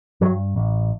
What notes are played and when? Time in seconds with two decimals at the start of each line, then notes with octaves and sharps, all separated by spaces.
0.21 G2 F#3
0.56 A1